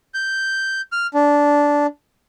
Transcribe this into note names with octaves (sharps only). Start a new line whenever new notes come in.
G6
F6
D4